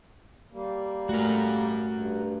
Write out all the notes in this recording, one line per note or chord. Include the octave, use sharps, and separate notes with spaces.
G3 A#3
A3 F#4 A#4
G2